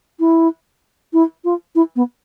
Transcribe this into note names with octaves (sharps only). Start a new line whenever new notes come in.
E4
E4
F4
E4
B3